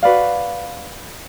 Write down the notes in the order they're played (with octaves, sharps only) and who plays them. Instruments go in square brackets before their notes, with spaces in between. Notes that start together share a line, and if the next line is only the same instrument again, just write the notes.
[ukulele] F#4 B4 D5 F5